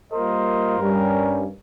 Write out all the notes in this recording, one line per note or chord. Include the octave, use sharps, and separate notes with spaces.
G3 A#3 F4 A#4 C5 D#5
G2 G3 C#4